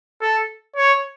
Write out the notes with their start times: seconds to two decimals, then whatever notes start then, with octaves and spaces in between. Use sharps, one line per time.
0.21 A4
0.76 C#5